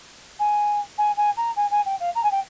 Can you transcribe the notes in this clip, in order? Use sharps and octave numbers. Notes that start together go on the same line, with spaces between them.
G#5
G#5
G#5
A#5
G#5
G#5
G5
F5
A#5
G#5
G5